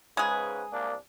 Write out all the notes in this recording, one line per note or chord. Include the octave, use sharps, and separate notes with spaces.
G#2 C#3 G#3 G#4 B4
C2 A#3 D4